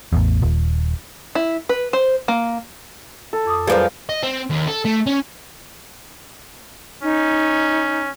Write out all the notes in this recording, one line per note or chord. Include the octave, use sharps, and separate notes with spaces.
A1 E2
D#1
E4
B4
C5
A#3
A4
F2 D6 D#6
F#2 F3 G3 G#4 A#4 B4 F5
D#5
C4
D#2
A4
A3
C#4
C#4 D#4